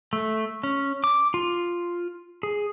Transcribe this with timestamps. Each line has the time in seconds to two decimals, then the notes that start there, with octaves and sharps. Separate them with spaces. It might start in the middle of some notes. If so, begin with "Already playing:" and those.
0.13 A3
0.63 C#4
1.04 D6
1.34 F4
2.43 G#4